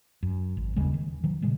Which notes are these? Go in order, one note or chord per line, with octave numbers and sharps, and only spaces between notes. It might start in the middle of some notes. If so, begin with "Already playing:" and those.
F#2
G#1
D#2 C#3 G3 G#3
D#3
D#3 F#3
A#2 C#3 G3 G#3